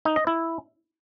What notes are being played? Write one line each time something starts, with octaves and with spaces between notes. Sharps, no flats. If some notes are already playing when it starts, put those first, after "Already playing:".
D#4
D#5
E4